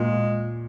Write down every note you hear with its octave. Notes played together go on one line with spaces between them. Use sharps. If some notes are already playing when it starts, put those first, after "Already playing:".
Already playing: A#2 G#3